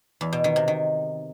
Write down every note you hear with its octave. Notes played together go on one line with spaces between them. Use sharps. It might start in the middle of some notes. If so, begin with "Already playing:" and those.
E2
B2
D#3
C3
D#3